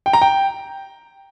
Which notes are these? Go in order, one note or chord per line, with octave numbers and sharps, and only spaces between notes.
G5
A#5
G5